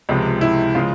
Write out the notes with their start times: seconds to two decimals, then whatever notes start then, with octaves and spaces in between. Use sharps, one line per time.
0.09 C#2 C3 F3 G#3
0.41 E4
0.75 C#3 F3 G#3 F4